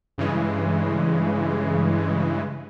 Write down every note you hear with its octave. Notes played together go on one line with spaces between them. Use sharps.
G2 C#3 E3 G#3